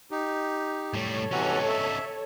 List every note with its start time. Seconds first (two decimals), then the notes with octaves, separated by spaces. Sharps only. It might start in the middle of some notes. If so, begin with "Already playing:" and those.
0.11 D#4 G4
0.94 A2 G3 A4 C#5
1.32 C3 E3 C#4 D#4 F#4
1.68 E5